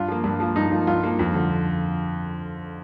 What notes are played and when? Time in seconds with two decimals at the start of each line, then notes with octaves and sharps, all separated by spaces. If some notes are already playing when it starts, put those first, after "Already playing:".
Already playing: G2 F4
0.08 F3 A#3
0.24 G2
0.40 F3 A#3
0.56 G2 D#4
0.71 F3 A#3
0.87 G2 F4
1.03 F3 A#3
1.19 F2
1.35 D3 F3